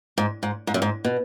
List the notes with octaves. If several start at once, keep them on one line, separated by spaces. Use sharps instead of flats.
G#2
G#2
G#2
F#2
G#2
B2